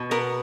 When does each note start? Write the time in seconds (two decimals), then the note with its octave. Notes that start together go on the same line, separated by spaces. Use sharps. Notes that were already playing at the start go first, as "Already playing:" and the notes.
Already playing: B2
0.11 B3 A#4